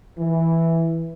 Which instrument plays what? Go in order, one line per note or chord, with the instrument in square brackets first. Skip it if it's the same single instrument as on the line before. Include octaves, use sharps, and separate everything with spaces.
[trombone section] E3